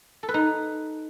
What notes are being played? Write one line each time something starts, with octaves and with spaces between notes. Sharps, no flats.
A4
B4
D#4